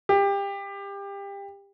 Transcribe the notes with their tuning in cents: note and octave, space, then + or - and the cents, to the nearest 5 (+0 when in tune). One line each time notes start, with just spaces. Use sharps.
G4 +25